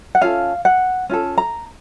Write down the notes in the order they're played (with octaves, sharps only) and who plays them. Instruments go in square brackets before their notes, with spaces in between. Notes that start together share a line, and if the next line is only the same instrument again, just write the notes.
[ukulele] F#5
C#4 F4 A4 F5
F#5
C#4 F4 A4
A#5